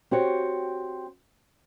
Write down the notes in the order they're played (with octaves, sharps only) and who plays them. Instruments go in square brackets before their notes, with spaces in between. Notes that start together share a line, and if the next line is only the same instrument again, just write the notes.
[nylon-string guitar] C4 F#4 G4 C#5